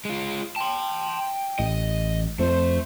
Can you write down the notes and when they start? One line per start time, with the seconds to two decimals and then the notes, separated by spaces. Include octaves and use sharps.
0.05 G#3 F4
0.56 G5 A5 C6
1.59 A1 D#5
2.39 F2 A3 C5